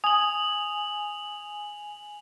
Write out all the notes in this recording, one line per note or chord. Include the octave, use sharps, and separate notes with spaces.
G#5 D#6 F7 F#7